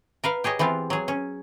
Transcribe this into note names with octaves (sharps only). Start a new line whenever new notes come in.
A#4 B4 F5
G4 G#4 C#5 D#5
E3 B3 C4 F4
F#3 G#4
C#4